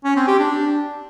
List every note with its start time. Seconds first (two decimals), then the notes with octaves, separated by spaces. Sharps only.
0.05 C#4
0.16 C4
0.28 G4
0.39 D4